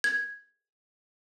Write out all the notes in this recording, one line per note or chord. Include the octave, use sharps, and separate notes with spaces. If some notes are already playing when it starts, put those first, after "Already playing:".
G#6